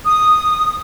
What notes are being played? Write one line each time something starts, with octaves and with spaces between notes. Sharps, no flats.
D#6